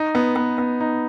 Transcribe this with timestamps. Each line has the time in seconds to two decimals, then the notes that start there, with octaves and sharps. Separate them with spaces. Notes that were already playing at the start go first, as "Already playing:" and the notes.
Already playing: D#4
0.15 B3
0.36 B3
0.58 B3
0.80 D#4